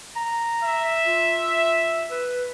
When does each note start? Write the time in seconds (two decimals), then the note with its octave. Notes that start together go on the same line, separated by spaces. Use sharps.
0.16 A#5
0.64 E5
1.05 F4
2.11 B4